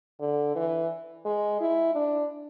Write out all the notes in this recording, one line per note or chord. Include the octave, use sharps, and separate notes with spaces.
D3
E3
G#3
E4
D4